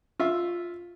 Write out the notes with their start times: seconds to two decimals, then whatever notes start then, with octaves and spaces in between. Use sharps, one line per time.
0.20 F4 E5